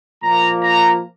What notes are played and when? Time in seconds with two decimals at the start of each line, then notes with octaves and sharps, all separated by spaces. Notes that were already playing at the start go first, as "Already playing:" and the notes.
0.22 A#2 F3 A#3 A#5
0.62 A#5